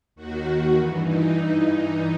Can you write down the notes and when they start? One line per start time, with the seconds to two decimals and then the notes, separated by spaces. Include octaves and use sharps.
0.15 D#2 D#3 F#4
0.71 G2 E3
1.00 D#4